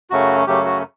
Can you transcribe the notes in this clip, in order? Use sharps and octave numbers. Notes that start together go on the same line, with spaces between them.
F#2 C#3 F#3 A3 C#4 F#4
F#2 C#3 F#3 A3 C#4 G4
F#4